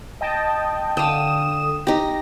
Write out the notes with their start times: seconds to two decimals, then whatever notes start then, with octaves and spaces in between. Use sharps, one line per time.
0.21 D#5 G5 A5
0.97 D3 F5 G5 D#6 E7
1.87 D#4 G4 A#6